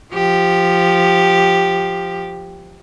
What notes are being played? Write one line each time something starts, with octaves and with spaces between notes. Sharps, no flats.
F3 G4